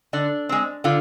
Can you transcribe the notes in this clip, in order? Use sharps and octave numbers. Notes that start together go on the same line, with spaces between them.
D3 D4
G#3 C4
D3 F4